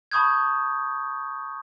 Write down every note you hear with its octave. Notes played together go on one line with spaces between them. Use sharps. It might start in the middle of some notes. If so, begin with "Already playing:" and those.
A5 B5 C#6 D#6 G6 G#6